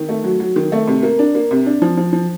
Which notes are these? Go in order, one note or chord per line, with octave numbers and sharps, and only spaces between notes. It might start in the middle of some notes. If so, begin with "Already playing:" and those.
Already playing: D#3
A3
F#3
F#3
D#3
A3
C3
A#3
D4
A#3
C3
D4
F3
F3
F3